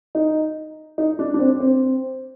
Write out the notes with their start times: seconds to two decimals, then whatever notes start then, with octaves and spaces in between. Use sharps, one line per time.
0.15 D#4
0.98 D#4
1.19 D4
1.34 D4
1.39 C4
1.60 C4